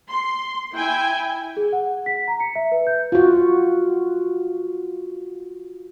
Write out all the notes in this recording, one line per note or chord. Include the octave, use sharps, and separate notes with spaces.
C6
E4 G5 G#5
G#4
F#5
B6
A#5
C#7
E5
B4
G6
F4 F#4